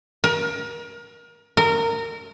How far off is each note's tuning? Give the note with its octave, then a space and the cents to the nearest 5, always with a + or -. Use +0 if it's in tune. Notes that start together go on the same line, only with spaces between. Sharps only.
A#4 +30
A#4 -20